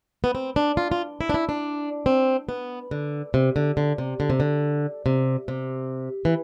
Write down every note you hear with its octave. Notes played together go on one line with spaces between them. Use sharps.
B3
C4
D4
F4
F4
E4
D4
E4
D4
C4
B3
D3
C3
D3
D3
C3
D3
C3
D3
C3
C3
E3